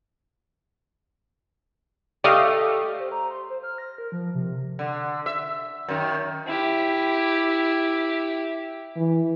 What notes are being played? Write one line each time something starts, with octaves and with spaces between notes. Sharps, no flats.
A3 G4 D5 D#5 F5
C5
A#5
C6
C5
F6
A#6
A#4
F3
C3
D3
E5
F#2 D#3
E4 G4
E3